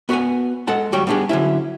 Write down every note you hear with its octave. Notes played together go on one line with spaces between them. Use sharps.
B3 F#4 B4 F#5 G#5
G#3 A4 F#5 A5
D2 F#3 G3 F#4 C#5 G5
G3 B3 D4 G4 G#4
D3 F#3 C#4 E4